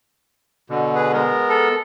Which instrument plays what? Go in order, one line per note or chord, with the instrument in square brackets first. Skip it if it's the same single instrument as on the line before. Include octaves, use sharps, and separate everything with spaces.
[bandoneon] B2 D3
[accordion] G#4 B4
G#3 B3 A#4
[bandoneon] A4